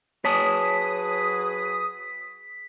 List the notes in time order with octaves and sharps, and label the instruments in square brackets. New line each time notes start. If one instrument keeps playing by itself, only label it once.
[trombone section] F#3 G#4 B4 [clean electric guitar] C#5 G#5 A5 [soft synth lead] D#6 [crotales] B6